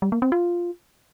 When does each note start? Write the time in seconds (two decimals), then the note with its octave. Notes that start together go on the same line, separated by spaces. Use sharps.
0.02 G3
0.12 A#3
0.22 C4
0.32 F4